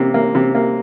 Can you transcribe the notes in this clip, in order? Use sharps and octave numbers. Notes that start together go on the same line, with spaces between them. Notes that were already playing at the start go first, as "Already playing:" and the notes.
Already playing: C3 A#3
A#3
C3
A#3